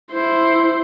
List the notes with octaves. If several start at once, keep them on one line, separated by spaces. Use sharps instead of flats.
E4 C5